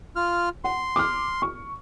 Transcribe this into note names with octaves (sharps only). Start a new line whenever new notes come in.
F4 F6
F#5 C6
D6 F6
C#6